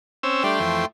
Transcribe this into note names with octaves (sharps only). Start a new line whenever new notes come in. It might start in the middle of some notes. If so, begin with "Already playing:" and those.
C4 C#4 E6
G3 A3 D4 G5 C6
F2 E3